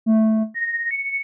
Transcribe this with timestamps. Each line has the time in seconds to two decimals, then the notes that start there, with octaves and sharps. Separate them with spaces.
0.06 A3
0.54 A#6
0.91 C#7